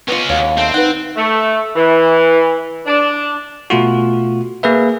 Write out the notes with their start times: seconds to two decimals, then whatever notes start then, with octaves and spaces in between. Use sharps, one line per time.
0.08 B3 C#4 F4 D#5
0.29 D#2 F#4 C#5 F5
0.57 A3 C4
0.74 D#4 B4 F#5
1.17 A3
1.75 E3
2.86 D4
3.70 B2 A3 F4 F#4
4.63 A#3 G#4 B4 E5